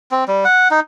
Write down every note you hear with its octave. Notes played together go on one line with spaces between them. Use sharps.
C4
G3
F#5
D#4